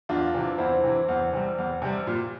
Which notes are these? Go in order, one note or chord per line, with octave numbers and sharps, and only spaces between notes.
E2 D4 F4
C3 E3
E2 C4 E4
C3 E3
E2
C3 G3
E2
C3 G3
A#2